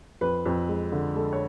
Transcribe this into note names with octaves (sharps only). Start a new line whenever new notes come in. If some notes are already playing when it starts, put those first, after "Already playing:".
F2 B4
F2
G#3
D3
G#3 A4
C#5